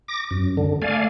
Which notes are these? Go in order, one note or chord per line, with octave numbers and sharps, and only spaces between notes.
D6 A#6
F#2
D3
A3 D5 F5 G#5